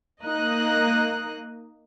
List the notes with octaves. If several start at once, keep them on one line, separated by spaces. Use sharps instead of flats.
A#3 D#4 D#5 F#6